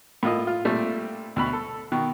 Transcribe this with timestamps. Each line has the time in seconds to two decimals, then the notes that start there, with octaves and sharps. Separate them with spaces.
0.23 A2 A#3 F4 D#5
0.47 F4
0.65 A#2 G3 A3 C4 D4
1.36 D2 B2 B5
1.53 A4
1.92 B2 D#3